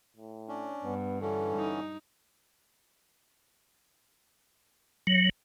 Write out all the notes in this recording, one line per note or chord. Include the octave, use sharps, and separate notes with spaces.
A2
C#4 D4
G2 B3
D3 E3 C#4 A4
D#4
F#3